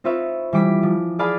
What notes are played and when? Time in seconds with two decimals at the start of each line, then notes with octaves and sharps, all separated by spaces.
0.04 C4 D#4 F4 B4 C#5 E5
0.53 E3 G3 D6 B6
0.83 F3
1.19 G#4 D5 F5 A5 B5 D#6